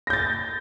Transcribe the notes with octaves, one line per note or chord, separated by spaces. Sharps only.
G6 A6 A#6